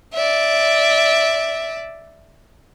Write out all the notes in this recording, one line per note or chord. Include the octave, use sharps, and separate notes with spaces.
D5 E5